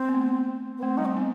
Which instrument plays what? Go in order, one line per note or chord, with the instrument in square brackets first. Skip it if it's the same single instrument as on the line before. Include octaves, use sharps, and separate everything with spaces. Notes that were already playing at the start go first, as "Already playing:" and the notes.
Already playing: [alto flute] C4
[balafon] B3
A3
[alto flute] B3
[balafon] A3 [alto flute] C4
[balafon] G3 [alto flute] D#4
[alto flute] C4
[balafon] B3